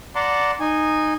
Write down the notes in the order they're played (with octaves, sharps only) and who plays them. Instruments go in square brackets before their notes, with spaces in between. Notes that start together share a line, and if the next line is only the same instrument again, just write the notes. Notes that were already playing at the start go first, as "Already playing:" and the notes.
[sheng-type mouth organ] D5 F#5 A5 A#5 C6 D6
D#4 G#5